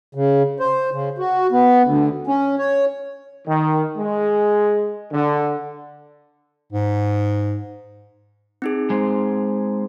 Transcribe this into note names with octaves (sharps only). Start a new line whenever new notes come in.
C#3
C5
C#3
F#4
B3
D2
C#4
C#5
D#3
G#3
D3
G#2
C4 D#4 G#4
G#3 C5